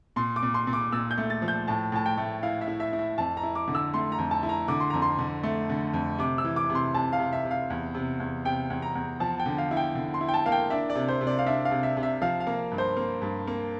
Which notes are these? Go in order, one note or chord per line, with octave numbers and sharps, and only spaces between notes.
A#2 C6
D6
A#2
C6
A#2
D6
A#2 E6
G6
A3
A6
F3
G6
A2 A5
A2 A5
G5
A3
E4 F5
E5
E4
E5
E4
E5
F2 A5
A#5
E4
D6
D3
E6
A3 C6
A#5
F2
A5
E4
A#5
D3 D6
C6
F2 A#5
C6
D3
A3
D3
F2
C3 D6
E6
E3
D6
C3
C6
C3 A5
F5
C3
E5
C3
F5
E2
C3
E2
C3 G5
E2
A#5
E2
F3 A5
G5
D3
F5
E4
G5
D3
C6
E4
G5
A5
A#3 F5
G5
D4 E5
D5
C3
C5
C3
D5
F5
D4 E5
F5
C3
E5
C3
E5
F3 F5
F5
A#3
G2
C5
A#3
G2
A#3